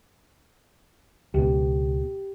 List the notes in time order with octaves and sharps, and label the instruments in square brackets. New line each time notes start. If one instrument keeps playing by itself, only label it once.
[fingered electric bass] C#2 B2 [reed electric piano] G4